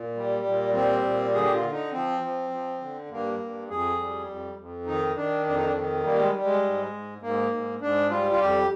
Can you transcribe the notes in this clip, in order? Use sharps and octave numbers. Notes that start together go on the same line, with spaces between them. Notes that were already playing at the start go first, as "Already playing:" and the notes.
Already playing: A#2
G3
A#2
G3 C4
A#2
D3 G#4
G4
F4
D3
D#4
F3 C4
F3
F3
D3
G2 A#3
G2
F2 G#4
G3
F2
F2
D#3 D#4
D#3 D4
F2 D4
D#4
D4
D#3
G3 A#3
G#3
G3
G#3
G#2
G#2
G#2 A#3
G#2
G#2 D4
G3 F4
F4
F2 G4